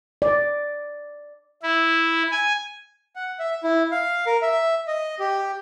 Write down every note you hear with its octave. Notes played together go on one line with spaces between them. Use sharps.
D5
E4
G#5
F#5
E5
E4
F5
A#4
E5
D#5
G4